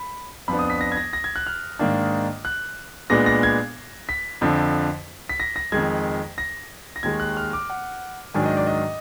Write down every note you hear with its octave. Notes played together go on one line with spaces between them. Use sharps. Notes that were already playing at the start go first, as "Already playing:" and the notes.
Already playing: B5
F2 F3 B3 D4 B5
D#6
B6
A#6
G#6
A#6
A#6
G#6
F#6
F6
G#2 D#3 A#3 D4
F#6
A#2 G#3 B3 D4 A#6
A#6
G#6
B6
F2 D3 F3
B6
A#6
A#6
F2 D#3 G#3 G#6
A#6
A#6
D#2 D#3 G#3 G#6
F#6
F6
D6
F#5
G#2 D#3 F#3 D4 G#5
D#5
D5
D#5